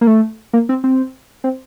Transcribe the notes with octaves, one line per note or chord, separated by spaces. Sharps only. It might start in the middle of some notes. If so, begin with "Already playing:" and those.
A#3
A3
A#3
C4
C4
C4